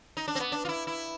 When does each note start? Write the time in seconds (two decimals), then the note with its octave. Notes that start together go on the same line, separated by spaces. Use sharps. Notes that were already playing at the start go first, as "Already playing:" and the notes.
0.17 D#4
0.28 D4
0.35 C4
0.40 B3
0.52 D4
0.65 F4
0.69 E4
0.87 E4